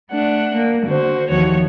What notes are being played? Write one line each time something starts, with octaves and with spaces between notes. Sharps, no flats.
A3 D4 F#5
A#3
D3 F#4 C5
D#2 E3 F3 F#4 C#5